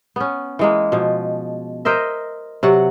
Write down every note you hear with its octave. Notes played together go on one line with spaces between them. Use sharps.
B3 C#4
E3 G#3 A#3
B2 F3
A#4 C5 D#5 E5
C3 F#3 F#4 F#5